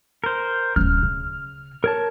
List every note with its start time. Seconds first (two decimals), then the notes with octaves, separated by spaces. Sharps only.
0.24 A#4 C5
0.76 D1 C#4 F6
1.03 C#3
1.84 A#4 C#5 A5